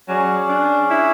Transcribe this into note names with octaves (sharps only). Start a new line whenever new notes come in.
F#3 C#4 G#4 D5
D4
E4